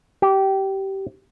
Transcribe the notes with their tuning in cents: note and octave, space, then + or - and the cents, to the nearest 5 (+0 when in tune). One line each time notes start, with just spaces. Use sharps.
G4 -20